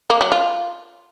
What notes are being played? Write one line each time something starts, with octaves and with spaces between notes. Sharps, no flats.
A#3
F#3
F4